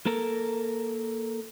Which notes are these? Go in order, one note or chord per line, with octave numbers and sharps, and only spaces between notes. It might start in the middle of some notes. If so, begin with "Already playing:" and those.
A#3 A4 A#4